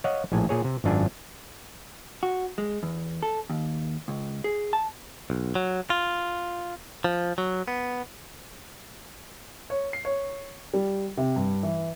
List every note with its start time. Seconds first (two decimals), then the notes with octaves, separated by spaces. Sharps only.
0.04 C#5 D#5 F5 F#5
0.32 A#1 A2 G#5
0.49 A#2 G#4 C#5
0.64 C3
0.84 G#1 F#2 D4 F4 G#5
2.23 F#4
2.58 G#3
2.83 E2
3.23 A4
3.50 D#2
4.08 C#2
4.44 G#4
4.73 A5
5.30 B1
5.55 F#3
5.90 F4
7.04 F3
7.38 F#3
7.68 B3
9.70 C#5
9.93 C7
10.05 C#5
10.74 G3
11.17 C3
11.36 G2
11.63 E3